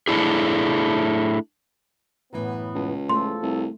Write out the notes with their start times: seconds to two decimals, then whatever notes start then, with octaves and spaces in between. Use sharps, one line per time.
0.08 A3 D4 E4 G#4
2.33 F#2 A2 E3 B3
2.75 C#2
3.09 E2 F3 A3 A4 C6
3.42 C2